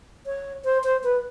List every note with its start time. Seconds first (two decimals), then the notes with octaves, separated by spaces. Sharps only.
0.26 C#5
0.65 C5
0.84 C5
1.04 B4